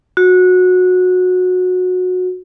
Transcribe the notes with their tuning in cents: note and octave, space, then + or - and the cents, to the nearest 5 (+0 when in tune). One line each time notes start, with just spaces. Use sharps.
F#4 -20